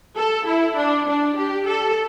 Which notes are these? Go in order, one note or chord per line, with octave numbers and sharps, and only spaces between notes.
A4
E4
D4
D4
G4
A4